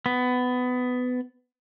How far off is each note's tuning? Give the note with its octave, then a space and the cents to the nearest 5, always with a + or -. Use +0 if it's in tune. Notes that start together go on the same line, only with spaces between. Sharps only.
B3 +20